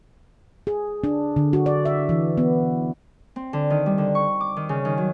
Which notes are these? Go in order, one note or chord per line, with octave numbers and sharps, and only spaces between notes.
G#4
D4
D3
F#4
D5
E5
E3
B3
C4
D3
D#3
G3
D3
C#6
D6
D#3
C#3
D#3
F#3